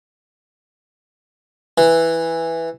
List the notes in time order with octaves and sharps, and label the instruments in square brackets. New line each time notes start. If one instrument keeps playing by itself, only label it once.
[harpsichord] E3